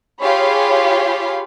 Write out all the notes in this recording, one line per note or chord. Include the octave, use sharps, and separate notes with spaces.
F4 G4 G#4 C#5 F5 B5